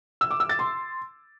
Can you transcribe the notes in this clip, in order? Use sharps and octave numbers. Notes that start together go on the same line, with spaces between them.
E6
D6
E6
A6
C6